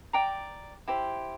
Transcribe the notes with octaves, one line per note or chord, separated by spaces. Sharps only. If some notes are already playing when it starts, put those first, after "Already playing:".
D5 G5 A#5
E4 G4 C5